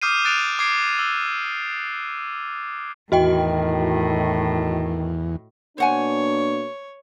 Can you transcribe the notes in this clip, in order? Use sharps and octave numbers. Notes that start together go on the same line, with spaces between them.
D6 D#6 F6 G6 C7 D#7
D#6 F#6 A6 D7 E7 F7
D6 G#6 C7 D7
E6
E2 A2 D#3 F#4 D#5 G5
B2 A#3 D4 C5 C#5 F#5 G#5